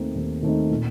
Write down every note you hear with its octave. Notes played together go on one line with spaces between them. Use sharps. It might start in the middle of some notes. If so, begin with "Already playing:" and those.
Already playing: D#2 D#3 A3 C4 D#4
D#2
D#3 A3 C4 D#4
A#2